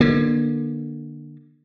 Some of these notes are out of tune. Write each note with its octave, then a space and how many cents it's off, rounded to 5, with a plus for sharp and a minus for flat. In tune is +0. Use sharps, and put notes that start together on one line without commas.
D3 +30 A#3 +40